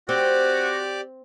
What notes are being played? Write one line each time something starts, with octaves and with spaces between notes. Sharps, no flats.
C4 F#4 G4 D5 D6